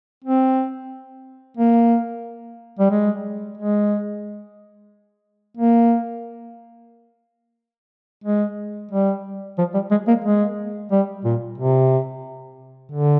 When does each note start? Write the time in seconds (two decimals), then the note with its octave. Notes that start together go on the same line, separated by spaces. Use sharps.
0.24 C4
1.57 A#3
2.79 G3
2.91 G#3
3.58 G#3
5.57 A#3
8.24 G#3
8.92 G3
9.58 F3
9.74 G3
9.91 G#3
10.08 A#3
10.24 G#3
10.91 G3
11.24 A#2
11.58 C3
12.92 D3